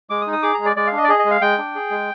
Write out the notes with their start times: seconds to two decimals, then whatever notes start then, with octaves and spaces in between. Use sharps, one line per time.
0.10 G#3 D6
0.21 D#6
0.27 D#4
0.32 D#6
0.42 G#4 D6
0.54 G#3 A#5
0.65 D5
0.76 G#3 D5
0.87 F5
0.92 D4
0.98 D#5
1.04 D5
1.09 G#4 D#5
1.19 D#5
1.25 G#3
1.31 F5
1.41 G#3 G5
1.58 D4
1.75 G#4
1.91 G#3